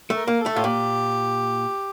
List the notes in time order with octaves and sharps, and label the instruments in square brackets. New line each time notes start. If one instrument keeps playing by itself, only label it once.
[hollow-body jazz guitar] A3
[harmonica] A#4
[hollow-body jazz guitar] A#3
[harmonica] A4
[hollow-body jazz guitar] A3
[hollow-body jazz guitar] A2 [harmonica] F4
[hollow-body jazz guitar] A#2 [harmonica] G4